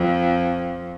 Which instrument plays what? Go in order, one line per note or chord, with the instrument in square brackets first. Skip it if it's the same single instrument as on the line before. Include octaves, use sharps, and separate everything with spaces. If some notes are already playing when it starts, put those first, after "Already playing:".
Already playing: [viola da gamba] F2